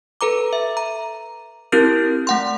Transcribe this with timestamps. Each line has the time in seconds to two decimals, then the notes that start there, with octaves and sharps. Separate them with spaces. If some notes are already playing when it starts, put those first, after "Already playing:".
0.21 A4 B4 A#5 D6
0.53 E5
0.77 A#5
1.72 C4 E4 G4 A#4 F6 G6
2.27 A3 F#5 C6